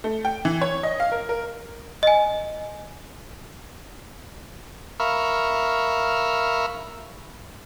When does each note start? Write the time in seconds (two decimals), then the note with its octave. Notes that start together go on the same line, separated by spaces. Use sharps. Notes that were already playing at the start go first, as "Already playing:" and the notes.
0.04 A3
0.25 G5
0.45 E3
0.62 C#5
0.83 D#5
1.00 F5
1.12 A#4
1.29 A#4
2.03 D#5 G#5
5.00 A#4 E5 F5 B5 C#6